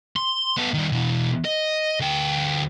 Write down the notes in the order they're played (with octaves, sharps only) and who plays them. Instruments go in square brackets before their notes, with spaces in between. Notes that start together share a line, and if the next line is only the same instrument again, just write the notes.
[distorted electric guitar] C6
B3 A4
D#3 G3
B2 E3
D#5
D2 G5